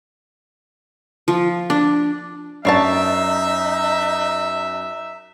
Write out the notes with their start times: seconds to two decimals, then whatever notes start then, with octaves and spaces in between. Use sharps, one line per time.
1.28 F3
1.70 D4
2.65 F#2 D4 D#4 C#5 E5 A5 C7